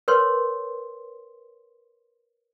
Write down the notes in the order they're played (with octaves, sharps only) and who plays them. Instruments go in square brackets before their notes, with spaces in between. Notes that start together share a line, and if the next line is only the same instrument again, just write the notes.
[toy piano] A#4 B4 C#5 C6